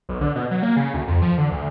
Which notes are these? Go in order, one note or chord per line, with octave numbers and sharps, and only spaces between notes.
B1
D3
B2
F#3
A#3
C#3
D2
F2
F3
D3
D2